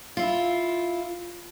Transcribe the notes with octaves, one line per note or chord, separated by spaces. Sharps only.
E4 F4